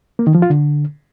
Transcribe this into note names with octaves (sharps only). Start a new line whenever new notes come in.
A#3
D#3
F3
F4
D3